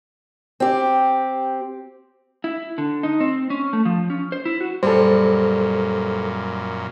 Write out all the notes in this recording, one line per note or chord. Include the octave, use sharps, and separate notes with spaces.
C4 G4
E4
D3
D#4
C4
C#4
A3
F3
C#4
C5
E4
F#4
F#2 A#2 G3 A4 C5